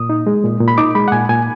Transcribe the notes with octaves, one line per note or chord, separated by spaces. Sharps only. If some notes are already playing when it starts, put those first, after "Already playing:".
Already playing: A#2 D#6
D#4
G#3
A#2
A#2
B5
D#4 D6
G#3 B5
F#5
A#2 G#5
A#2 G#5